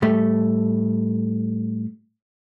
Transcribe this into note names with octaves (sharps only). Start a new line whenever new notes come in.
A2 G3 A3